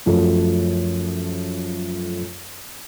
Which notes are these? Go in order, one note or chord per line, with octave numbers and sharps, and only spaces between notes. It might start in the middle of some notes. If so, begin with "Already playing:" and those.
F#2 F3 A3